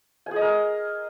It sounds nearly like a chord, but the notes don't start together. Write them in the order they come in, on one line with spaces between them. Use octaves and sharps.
G#5 G#4 D#5 A#4